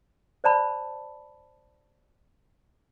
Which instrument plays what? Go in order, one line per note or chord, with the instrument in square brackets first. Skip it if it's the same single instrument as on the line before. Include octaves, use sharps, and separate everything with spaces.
[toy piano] C5 D5 A5 B5